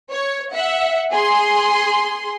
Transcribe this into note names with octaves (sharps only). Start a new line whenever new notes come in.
C#5
E5 F#5
G#4 C6